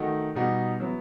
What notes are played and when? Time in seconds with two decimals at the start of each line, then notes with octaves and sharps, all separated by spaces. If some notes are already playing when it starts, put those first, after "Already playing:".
Already playing: D#3 A3 D#4 F#4
0.35 B2 G3 D#4 F#4
0.80 F#3 B3 E4